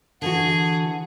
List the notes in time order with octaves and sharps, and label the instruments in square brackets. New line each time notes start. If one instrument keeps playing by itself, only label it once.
[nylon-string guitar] D3 E3 F#4 [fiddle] G#4 [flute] F#5